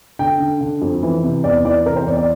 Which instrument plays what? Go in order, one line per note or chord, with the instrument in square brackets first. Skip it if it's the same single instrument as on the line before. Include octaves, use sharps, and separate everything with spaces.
[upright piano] D3 G5
D3
D3
F2
E3
C3
E2 D5
E3 D5
C3 A#4
C5
E2 D5
D5